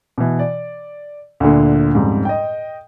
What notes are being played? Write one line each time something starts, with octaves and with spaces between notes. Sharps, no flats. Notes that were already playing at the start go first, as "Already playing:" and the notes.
B2 E3
D5
D2 A#2 D3
F2 G#2 C#3 G3
D#5 G5